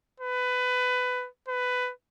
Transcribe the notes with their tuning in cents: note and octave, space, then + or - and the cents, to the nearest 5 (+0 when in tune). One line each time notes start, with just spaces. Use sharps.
B4 +20
B4 +15